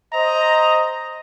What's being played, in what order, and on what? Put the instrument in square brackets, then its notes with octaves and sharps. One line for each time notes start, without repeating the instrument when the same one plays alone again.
[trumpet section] C5 D#5 [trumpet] A#5